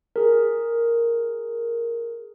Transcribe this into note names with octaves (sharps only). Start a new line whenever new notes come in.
G#4 A#4